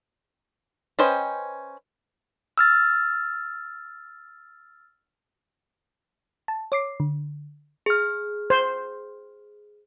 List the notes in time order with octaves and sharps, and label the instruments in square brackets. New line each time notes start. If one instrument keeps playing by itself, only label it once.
[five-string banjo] C#4 B4 C5 D#5 G5
[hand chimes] E6 F6 A6
[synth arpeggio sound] A5
C#5 D6 C7
D3
[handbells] G#4 F6
[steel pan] C5